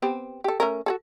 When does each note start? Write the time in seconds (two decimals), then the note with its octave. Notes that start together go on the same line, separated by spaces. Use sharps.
0.02 B3 C4 G4
0.44 G4 A4
0.60 A3 C#4 A#4
0.86 F#4 G#4 A4